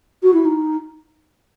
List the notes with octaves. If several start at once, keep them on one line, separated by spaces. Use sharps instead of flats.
F#4
E4
D#4